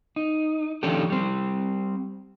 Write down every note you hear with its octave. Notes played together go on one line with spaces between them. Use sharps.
D#4
D#3 F3 C#4 D4 G4 A4
G3 C4